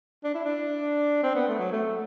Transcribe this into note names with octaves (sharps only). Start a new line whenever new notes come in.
D4
E4
D4
C4
B3
A3
F#3
A3